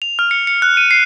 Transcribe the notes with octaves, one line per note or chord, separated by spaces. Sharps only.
F7
F6
C#7
C#7
F#6
D#7
C7